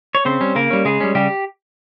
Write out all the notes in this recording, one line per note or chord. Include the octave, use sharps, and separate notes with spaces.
C#5
C#3 C4 C5
G3 C#4
C#3 A#3 A#4
G3 C#4
C#3 G#3 G#4
G3 C#4
C#3 G3 G4